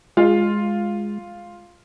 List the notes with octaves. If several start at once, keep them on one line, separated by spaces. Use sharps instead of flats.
G#3 F4